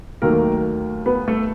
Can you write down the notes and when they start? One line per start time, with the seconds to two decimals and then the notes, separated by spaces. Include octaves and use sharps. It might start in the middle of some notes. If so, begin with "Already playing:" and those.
0.22 D#2 D#3 F#3 A3 A#3 A#4
1.06 B3 B4
1.28 A3 A4